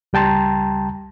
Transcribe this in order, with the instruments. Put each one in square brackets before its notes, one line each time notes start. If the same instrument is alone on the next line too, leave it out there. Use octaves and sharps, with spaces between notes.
[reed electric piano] C#2 G3 G5 A5 A#5 C6